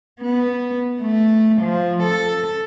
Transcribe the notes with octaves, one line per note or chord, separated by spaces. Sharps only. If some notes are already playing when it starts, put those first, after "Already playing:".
B3
A3
F3
A4